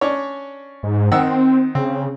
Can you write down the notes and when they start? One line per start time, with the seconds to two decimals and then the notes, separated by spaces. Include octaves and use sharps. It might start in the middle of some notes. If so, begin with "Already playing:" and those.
0.01 C#4 D4 C#5
0.83 G#2
1.12 D#3 C4 F#5 E6
1.75 C#3 C4